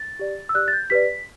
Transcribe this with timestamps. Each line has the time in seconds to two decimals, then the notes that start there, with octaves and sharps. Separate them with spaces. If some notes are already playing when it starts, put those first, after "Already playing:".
Already playing: A6
0.19 G4 D5
0.49 E6
0.54 G4 D5 F#6
0.68 A6
0.73 G6
0.90 G4 B4 D5 B6